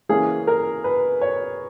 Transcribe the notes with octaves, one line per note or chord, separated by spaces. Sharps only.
E3 A#3 C#4 G#4
A#4
B4
C#5